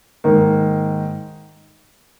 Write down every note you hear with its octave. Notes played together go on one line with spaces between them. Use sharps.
G#2 D#3 A#3